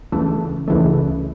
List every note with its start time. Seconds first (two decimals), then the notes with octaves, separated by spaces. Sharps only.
0.12 C#2 C#3 E3 A3
0.68 C#2 C#3 E3 A3